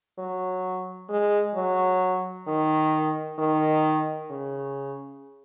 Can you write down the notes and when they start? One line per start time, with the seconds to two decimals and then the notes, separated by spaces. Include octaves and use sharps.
0.18 F#3
1.09 G#3
1.55 F#3
2.47 D#3
3.39 D#3
4.30 C#3